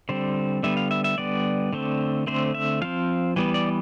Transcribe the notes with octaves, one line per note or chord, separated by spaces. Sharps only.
D3 G3 C4 C5
D3 G3 B3 E5
F5
E5
E5
D3 G3 B3 D5
D3 A3 C4
D3 A3 C4 C5
E5
F3 C4 F5
E3 G3 B3
D5